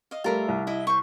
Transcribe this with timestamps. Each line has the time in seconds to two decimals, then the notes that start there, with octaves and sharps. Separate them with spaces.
0.11 D#5 F5
0.24 G3 A3 F4 A#4 E5
0.48 C2
0.67 E4 D#5 E5
0.87 C5 C#6